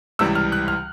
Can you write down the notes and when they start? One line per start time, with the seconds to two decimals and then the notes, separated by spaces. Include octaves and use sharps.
0.19 C#2 C3 E3 G3 E6
0.35 F6
0.52 F#6
0.68 F6